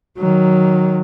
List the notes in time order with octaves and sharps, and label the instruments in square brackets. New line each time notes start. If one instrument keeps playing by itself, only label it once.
[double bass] D#3 F#3